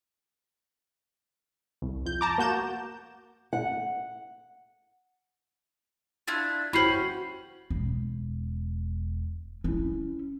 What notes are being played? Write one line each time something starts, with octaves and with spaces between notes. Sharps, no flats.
C2
F2 G6
A5 A#5 D6
A#3 F#4 G6 E7
F#5
D4 E4 F4 G#6 A6
C#4 E4 F#4 G4 C5 B5 C7 F#7
E1
C#4 E4